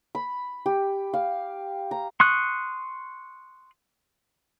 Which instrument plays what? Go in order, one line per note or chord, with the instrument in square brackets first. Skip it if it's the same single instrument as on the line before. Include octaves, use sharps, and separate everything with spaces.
[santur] B5
G4
F5
A#5
[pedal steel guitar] C6 C#6 D#6 F#6